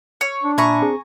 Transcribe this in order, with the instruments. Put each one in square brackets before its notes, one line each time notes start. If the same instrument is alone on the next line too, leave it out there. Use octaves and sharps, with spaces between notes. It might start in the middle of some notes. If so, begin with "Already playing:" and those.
[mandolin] C#5
[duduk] D4
[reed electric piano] A#2 E5 B5 [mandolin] G#5 A#5 C#6
[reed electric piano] C4 G#4